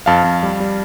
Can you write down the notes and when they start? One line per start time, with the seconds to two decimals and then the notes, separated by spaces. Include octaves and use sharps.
0.06 F2 F5 A5
0.24 F2
0.43 G3
0.60 G3